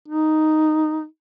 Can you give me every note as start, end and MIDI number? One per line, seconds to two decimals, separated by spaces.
0.08 1.05 63